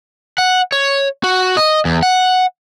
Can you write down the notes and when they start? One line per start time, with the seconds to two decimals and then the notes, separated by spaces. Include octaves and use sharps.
0.38 F#5
0.72 C#5
1.24 F#4
1.57 D#5
1.85 E2
2.03 F#5